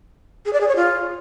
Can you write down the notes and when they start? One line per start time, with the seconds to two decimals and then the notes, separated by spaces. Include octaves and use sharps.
0.45 G#4
0.53 D5
0.61 G#4
0.68 C#5
0.76 F4